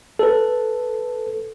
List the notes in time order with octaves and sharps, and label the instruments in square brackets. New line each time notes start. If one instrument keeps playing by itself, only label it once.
[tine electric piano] A4 B4